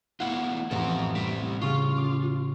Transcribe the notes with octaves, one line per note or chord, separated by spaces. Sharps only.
B3 E4 F4 F#5
A1 F2 C4 A4 A#5
G3 C4 B6 D7
C#3 F4 C#6
D6